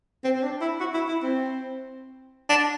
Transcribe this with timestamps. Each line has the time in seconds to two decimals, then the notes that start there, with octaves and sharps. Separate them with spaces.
0.24 C4
0.36 C4
0.43 D4
0.61 E4
0.80 F#4
0.94 E4
1.08 E4
1.23 C4
2.49 D4